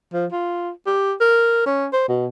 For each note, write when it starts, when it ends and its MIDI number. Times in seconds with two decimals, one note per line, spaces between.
0.13 0.26 53
0.32 0.70 65
0.86 1.13 67
1.20 1.63 70
1.66 1.87 61
1.93 2.03 72
2.08 2.27 47